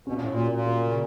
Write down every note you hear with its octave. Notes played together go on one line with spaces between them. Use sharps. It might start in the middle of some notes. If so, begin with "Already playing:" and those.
B2 C#4
A#2
A2
A#2
F#4
A#2
A#3
C#3